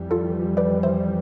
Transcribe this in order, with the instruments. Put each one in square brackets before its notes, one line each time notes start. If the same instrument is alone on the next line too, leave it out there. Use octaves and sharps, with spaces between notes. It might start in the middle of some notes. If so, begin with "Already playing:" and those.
Already playing: [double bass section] F2 E3 G3
[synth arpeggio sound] F4 A4
B4 D5
C5 E5